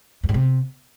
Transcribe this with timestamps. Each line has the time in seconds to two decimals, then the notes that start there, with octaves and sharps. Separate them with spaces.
0.23 F2
0.29 G#2
0.34 C3